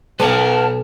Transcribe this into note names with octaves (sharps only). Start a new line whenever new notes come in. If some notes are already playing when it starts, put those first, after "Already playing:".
B1 A#4 B4 C#5 F#5 A5